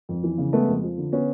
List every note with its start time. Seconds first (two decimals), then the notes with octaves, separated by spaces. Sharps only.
0.09 F2
0.23 E3
0.38 C#3
0.53 G#3 A3 B3
0.68 F2
0.83 F3
0.98 D3
1.13 B3 C#4